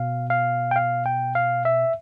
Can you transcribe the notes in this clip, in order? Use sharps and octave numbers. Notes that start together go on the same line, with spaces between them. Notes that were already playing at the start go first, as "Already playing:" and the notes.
Already playing: B2 F5
F5
G5
F5
G5
F5
E5